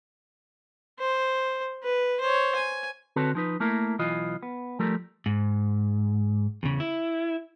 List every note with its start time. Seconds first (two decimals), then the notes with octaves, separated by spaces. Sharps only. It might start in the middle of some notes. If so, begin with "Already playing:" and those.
1.00 C5
1.83 B4
2.21 C5 C#5
2.56 G#5
3.16 D3 C4 F#4 A4 B4 C#5
3.35 F3 D#4 B4
3.60 A3 A#3 E4 A#4
3.99 B1 E3 F4 D#5
4.43 B3
4.79 F3 G3 A3 A#4
5.26 G#2
6.63 E2 C#3
6.80 E4